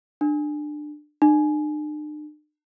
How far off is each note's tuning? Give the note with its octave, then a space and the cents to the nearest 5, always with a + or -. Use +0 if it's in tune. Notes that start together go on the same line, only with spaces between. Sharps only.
D4 +25
D4 +45